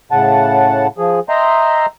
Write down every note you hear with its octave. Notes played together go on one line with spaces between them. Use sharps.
A2 C#3 F#5 A5
F3 G#4
D#5 E5 G5 A#5 C6